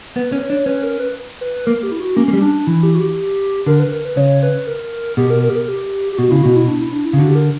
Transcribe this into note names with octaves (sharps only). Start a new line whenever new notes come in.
B3 B4
C#4
B4
C#5
D4
C#4 B4
A#4
B4
B4
A#3 A#4
G4
E4
F#4
A#3 C#4
A#3
G3
D4
E3 E4
G4
F#4
G4
D3 A#4
B4
A#4
B4
C#3 C#5
B4
A#4
B2 G4
A#4
A#4
G4
A#4
G4
G4
B2 F#4
C#3 E4
B2 F#4
E4
D4
E4
D4
E4
C#3
D3 F#4
G4
A#4